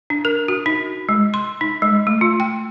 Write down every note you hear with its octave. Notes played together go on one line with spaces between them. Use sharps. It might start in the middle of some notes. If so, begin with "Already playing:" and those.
D4
A#4
F#4
D#4
G#3
C6
D#4
G#3
A3
F4
G5